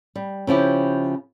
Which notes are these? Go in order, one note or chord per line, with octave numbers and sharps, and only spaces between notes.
G3
C#3 F3 E4 G4